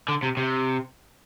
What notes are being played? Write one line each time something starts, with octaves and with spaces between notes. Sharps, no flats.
D3
C3
C3